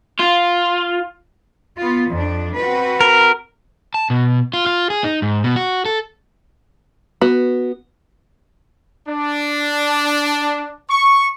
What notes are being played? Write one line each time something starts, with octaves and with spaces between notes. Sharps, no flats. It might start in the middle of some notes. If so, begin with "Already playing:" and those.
F4
B3 F4
F2 D4
C4 F#4 B4
A#4
A5
B2
F4
F4
G#4
D#4
G#2
B2
F#4
A4
B3 F#4
D4
C#6